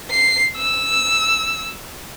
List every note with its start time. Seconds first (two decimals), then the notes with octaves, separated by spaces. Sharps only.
0.10 C7
0.57 E6